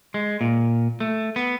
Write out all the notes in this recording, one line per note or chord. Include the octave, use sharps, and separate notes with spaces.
G#3
A#2
A3
B3